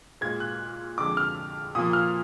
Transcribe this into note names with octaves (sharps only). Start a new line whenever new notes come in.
A#2 G#3 G#6
F#6
F2 D3 G#3 D6
F6
A#2 F3 A#3 D#6
F6